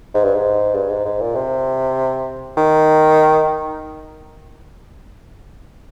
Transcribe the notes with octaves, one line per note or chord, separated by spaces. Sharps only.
G#2
G2
G#2
G2
G#2
G#2
A#2
C3
D#3